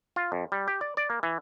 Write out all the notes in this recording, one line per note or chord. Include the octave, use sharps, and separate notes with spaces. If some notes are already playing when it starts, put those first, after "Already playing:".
F4
F2
G3
G4
D5
D5
A#3
E3